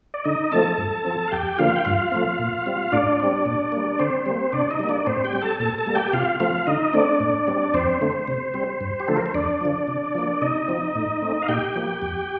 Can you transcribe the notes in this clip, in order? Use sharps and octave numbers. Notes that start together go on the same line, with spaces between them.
D5
D3 D#4 D#5
F3 A3 C4 A4 A5
G2
F3 C4
F5
F2 G4 G5
D3 F3 A#3 F4 F5
G5
G2 F4 F5
F3 A3 C4
A#2
G3 C4
A2 D4 D5
G3 C4
A#2
G3 A#3
D3 C4 C5
G3 A#3
C3 D4 D5
D#4 D#5
G3 A#3
D4 D5
A2 C4 C5
G4 G5
G3 C4
A4 A5
A#2 A4 A5
A4 A5
G3 A#3
G4 G5
C3 F4 F5
F3 A3 C4 F4 F5
D3 D#4 D#5
A3 C4 D4 D5
A2
G3 C4
F2 C4 C5
D3 A3 C4
C3
G3 C4
G2
G4
D3 F3 A3 A4
A#4
C5
F2 D4 D5
D3 F3
C3
F3 A#3
C3 D#4 D#5
F3 C4
A2
A3 C4
F5
A#2 G4 G5
F3 A#3
F2